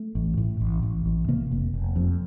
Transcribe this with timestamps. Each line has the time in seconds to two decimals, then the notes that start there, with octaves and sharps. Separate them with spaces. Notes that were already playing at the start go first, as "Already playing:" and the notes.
Already playing: A3
0.15 A1
0.37 A2
0.60 A1
0.83 A1
1.06 A1
1.28 C3 A#3
1.51 F1
1.74 F1
1.96 F2